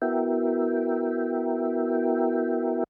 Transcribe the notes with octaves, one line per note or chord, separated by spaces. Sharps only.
B3 E4 F#4 A#4 E5 G5